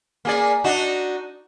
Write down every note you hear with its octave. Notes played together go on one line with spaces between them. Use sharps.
A#3 G#4 D5
D4 D#4 F#4